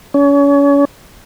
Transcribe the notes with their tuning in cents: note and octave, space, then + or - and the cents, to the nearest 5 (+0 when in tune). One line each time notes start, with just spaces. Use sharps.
C#4 +35